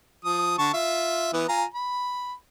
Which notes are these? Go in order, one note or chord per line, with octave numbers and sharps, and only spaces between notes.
F3 D#6
D3 A5 C#6
F4 E5
E3 B3
F4 G#5 A#5
B5